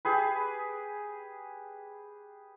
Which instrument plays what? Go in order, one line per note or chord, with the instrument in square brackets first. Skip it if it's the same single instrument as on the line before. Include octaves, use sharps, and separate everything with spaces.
[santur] G4 G#4 B4